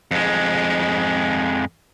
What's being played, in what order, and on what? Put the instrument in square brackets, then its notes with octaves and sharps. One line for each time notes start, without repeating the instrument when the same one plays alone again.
[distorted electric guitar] F2 G#3